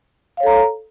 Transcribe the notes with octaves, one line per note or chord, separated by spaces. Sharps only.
A4 C#5 F5 A#5